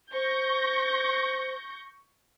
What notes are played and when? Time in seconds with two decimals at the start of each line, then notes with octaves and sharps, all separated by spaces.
0.13 C5 C#6 G6 A#6